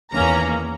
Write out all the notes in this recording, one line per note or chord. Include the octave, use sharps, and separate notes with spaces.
E2 D#3 A#3 C#4 A#5